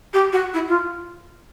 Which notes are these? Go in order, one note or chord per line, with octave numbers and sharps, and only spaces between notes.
G4
F#4
E4
F4